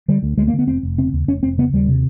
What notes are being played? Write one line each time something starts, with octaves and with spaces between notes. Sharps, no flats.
D3 G3
D2
D2 G#3
A#3
D3
B3
F1 C4
F1
C#3 C4
D#2
F1 C#4
F1 C4
C#3 B3
D#2 G3
C3